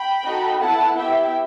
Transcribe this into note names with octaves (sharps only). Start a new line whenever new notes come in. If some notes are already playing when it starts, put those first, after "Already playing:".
Already playing: G5 B5
D#4 F#4 A4
B3 E4 A4 F#5 A5
B3 E4 G4 E5 G5